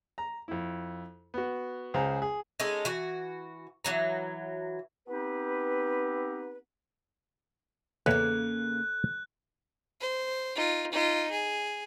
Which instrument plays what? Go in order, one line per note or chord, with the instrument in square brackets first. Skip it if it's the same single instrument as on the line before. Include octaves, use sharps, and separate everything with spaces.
[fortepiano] A#5
F2 E4
B3 F#4
C#2 G#4 C5 F5 A#5
G#4
[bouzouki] G#3 C#4 D#4 A4
E3 F#4
E3 F#3 A#5
[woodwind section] B3 C4 D#4 G4 B4
[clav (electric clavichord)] E2 B4 C#5 [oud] C#3 A#3 [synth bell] A4 [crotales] F#6
[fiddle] C5
D#4 F4
D#4 F4
G#4